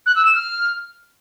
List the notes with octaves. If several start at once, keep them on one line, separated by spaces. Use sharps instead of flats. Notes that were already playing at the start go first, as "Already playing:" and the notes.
F#6
E6
E7
F6